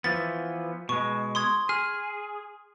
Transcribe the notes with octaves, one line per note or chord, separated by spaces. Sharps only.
E3 F3 B3 A6
B2 G#3 C#6
C6 D#6 G#6
G#4 F6